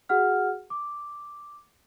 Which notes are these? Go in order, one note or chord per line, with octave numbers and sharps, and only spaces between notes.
F#4 G#4 F#5 F6
D6